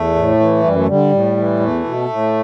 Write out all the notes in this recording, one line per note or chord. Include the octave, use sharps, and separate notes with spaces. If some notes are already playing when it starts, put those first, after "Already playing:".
Already playing: E2 A3
A2
E3
F#2 G3
A3
D3 G3
A2
E3
E2 A3
B2
A2